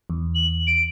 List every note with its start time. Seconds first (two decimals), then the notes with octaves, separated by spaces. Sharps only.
0.10 E2
0.35 F#7
0.67 D7